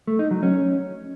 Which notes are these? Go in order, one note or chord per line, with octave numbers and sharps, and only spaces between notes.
A3
D#4
F#3
C#4